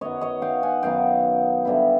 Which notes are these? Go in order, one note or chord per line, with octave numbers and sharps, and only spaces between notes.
F#2 D#3 F#3 B3 C#5 D#5
C#5 D#5
F5 G5
F#5 G#5
F#2 D#3 F#3 B3 F5 G5
D3 G3 B3 E4